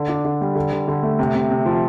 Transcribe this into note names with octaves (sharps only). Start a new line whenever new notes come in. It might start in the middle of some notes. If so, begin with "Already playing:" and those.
Already playing: D3
D4
D3
G3
D3
D3
D3
A3
C3
C3
C3
F3